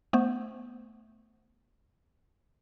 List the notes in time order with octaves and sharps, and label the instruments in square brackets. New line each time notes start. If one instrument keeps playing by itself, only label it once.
[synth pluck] A3 B3 C5